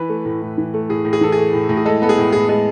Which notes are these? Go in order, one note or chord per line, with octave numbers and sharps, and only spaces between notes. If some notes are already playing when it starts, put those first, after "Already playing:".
Already playing: E3 B4
A3
A2
A2
E3
A3
A2 G#4
A2
G#4
E3 A4
A3 G#4
A2
A2
G#4
G#3 A4
B3 A4
G#4
A2
A2 G#4
G#3 G#4